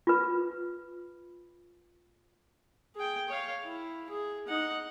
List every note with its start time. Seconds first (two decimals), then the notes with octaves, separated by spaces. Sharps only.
0.07 F4 B4
2.96 G#4 G5
3.29 C#5 F5
3.64 E4
4.10 G#4
4.48 D#4 F#5